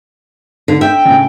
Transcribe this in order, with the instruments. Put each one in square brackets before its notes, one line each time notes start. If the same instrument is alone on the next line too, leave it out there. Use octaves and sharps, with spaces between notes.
[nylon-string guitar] D3
[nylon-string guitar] E5 [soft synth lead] G5
[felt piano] A2 C#3